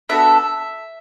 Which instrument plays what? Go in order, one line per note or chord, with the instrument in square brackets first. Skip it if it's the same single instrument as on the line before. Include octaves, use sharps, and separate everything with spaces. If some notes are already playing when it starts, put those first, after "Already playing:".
[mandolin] B3 D4 F#4 A4 E5